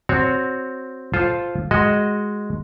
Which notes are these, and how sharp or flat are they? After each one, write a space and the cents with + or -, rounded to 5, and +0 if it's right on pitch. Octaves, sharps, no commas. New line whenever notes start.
C4 +0 F#4 +0 C#5 +10
F4 +0 A4 -15 C5 +0
G#3 +0 F#4 +0 D#5 +0